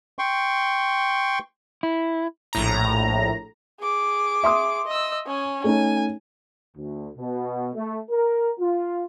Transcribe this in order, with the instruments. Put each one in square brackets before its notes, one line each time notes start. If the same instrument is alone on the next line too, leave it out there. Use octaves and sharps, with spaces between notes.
[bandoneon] G5 C6 C#6
[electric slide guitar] E4
[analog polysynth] A#1 A2 A#5
[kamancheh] G#4 D6
[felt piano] E5 C6 D#6
[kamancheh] D#5 E6
C#4 G#5
[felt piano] A3 C#4 D#4 [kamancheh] G#5
[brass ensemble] D2
B2
A3
A#4
F4